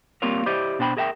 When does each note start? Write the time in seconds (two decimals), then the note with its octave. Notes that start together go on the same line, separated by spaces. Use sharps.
0.22 G3 A#3 C4 F4 A#4 C#5
0.46 E4 G4 C5 D5 D#5
0.79 B2 D4 C5 G5 B5
0.97 G#4 A#4 E5 F#5 G5